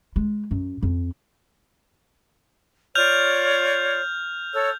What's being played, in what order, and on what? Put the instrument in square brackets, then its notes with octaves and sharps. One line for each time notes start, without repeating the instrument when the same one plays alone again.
[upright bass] G#3
F#2
F2
[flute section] F4 C#5 D5 [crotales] F6 G6 F7
[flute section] A4 C#5 E6